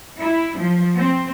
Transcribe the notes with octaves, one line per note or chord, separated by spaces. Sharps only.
E4
F3
C4